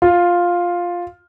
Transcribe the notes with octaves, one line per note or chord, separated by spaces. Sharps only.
F4